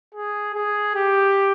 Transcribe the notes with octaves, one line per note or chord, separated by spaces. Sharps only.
G#4
G#4
G4